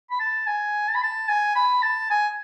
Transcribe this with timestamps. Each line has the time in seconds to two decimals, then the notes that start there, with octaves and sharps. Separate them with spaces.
0.10 B5
0.20 A5
0.47 G#5
0.88 A5
0.95 B5
1.02 A5
1.29 G#5
1.56 B5
1.82 A5
2.10 G#5